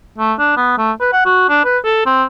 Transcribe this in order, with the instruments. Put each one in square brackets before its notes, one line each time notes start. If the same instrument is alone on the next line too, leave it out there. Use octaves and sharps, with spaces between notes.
[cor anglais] A3
D4
B3
A3
B4
F#5
F#4
D4
B4
A4
C4